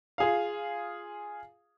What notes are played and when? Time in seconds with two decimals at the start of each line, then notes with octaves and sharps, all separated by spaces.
0.18 F4 G#4 F5